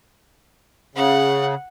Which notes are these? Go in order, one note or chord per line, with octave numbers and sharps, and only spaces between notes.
C#3 F#5